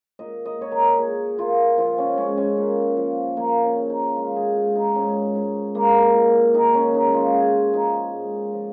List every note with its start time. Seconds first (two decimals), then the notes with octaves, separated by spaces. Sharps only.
0.19 A#2 D#5
0.46 D#5
0.58 A#2 C#5
0.72 A#4
0.98 A#2 G#4
1.38 A#2 F4
1.78 F3 F4
1.98 C#4
2.18 G#3 C#4
2.37 C#4
2.57 A#2
2.97 F3
3.36 F3 A#3
3.63 C#4
3.76 C#3
3.90 D#4
4.16 G#3 F4
4.36 G#4
4.56 G#3 F4
4.76 D#4
4.95 G#2 C#4
5.35 G#2
5.75 G#3 A#3
6.15 A#2
6.54 D#3 D#4
6.74 C#4
6.94 G#3 D#4
7.14 F4
7.33 C#3 G#4
7.74 F3 D#4
8.13 G#2
8.53 F3